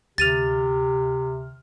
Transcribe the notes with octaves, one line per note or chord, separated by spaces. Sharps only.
D2 C3 G4 F6 A6 D#7 F7